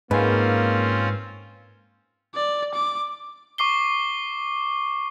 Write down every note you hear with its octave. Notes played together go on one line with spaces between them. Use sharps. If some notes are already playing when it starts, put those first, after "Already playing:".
G#2 A#3 C4 C#4 F4 B4 G#5 C6
D5
D6
C#6 D6 C7 G7